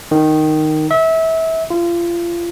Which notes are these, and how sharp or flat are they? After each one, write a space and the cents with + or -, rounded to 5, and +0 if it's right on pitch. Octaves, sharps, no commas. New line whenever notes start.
D#3 -5
E5 -25
F4 -30